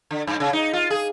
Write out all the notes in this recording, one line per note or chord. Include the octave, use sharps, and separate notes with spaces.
D3
G2
C#3
D#4
F4
G#4